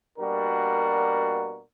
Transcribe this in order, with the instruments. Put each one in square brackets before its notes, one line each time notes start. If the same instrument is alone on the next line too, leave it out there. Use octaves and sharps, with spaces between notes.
[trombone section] B2 G3 A#3 D4 F#4 [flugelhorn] A#4